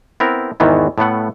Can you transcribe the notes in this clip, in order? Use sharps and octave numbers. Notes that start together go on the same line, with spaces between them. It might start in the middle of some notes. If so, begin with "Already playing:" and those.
B3 C4 E4 A#4
E2 G#2 D#3 E3 B3
A2 A3 B3 F#5